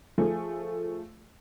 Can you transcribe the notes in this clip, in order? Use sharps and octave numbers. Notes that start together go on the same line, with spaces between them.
F3 A3 G#4